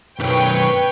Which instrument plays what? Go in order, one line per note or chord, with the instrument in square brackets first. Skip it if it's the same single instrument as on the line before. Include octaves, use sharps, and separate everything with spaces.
[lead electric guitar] B1 F#2 [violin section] B4 C#5 G5